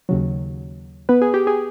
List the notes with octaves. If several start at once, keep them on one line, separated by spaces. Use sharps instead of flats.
D#2 C#3 F#3
B3 B4
G#4
G4
G#4